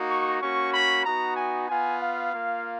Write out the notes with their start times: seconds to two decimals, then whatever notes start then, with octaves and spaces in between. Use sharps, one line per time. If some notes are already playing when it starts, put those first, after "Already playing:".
Already playing: A#3 D#4 F#4
0.10 C#6
0.42 A#3 C#4 F#4 C#6
0.74 B5
1.05 B3 D#4 F#4 A#5
1.37 G#5
1.68 B3 F4 G#5
2.00 F5
2.32 A#3 F4